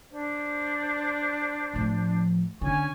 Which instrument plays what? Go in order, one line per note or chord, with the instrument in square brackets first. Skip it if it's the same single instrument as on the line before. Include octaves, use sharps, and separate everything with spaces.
[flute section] D4 C5
[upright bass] A2 F3
[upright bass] D3 [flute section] C#4 G#5 C#6